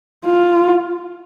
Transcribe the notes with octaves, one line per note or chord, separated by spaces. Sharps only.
F4